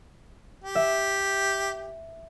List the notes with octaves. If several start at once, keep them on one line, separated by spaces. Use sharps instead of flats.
G4
E5